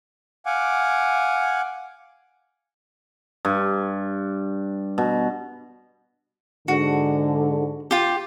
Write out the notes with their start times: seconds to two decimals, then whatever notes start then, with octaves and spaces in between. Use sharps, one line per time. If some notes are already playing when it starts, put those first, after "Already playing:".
0.46 F5 F#5 G#5 D6
3.45 G2
4.98 B2
6.68 G#2 D3 F#4
7.91 F4 G4